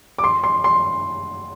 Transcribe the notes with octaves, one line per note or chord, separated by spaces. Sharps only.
D6
C6
C6
C6